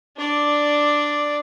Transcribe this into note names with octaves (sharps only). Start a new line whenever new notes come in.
D4 D5